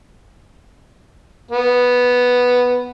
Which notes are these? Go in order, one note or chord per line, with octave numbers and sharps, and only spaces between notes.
B3